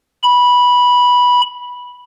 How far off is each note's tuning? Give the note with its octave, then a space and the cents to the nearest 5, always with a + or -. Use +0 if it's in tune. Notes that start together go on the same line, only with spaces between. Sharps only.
B5 -10